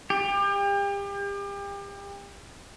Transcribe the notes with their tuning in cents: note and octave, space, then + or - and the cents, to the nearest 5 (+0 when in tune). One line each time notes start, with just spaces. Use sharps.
G4 +35